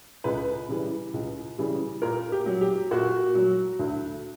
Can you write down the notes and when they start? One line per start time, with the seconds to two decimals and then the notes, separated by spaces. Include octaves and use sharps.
0.24 C#2 B4
0.69 C#3 E3 G3
1.14 C#2
1.58 C#3 E3 G3
2.02 A#2 A#4
2.32 G4
2.46 F#3
2.61 G4
2.91 A#2 F#4
3.35 F#3
3.79 D2